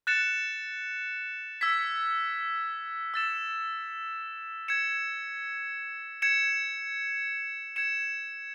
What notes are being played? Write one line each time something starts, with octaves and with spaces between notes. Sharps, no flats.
F#6 A6 C#7 E7
E6 G#6 B6
E6 A6 E7
G#6 C#7 E7
G#6 C#7 E7
G#6 C#7 E7